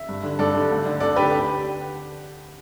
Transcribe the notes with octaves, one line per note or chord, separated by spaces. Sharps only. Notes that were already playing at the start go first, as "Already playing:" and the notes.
Already playing: E5
G2
D3
G2 A4 D5
D3
D2
D3
D2 A4 D5
D3 G4 B4
G4